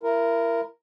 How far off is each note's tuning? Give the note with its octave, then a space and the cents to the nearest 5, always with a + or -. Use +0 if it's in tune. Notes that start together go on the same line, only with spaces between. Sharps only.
E4 +30 A#4 +0